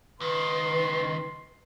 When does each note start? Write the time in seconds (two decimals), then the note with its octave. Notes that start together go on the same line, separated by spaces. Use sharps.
0.20 C#2 D#3 B4 C6